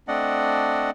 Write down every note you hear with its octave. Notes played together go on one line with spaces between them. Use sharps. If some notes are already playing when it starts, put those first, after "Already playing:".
A3 C4 D4 D5 D#5 F#5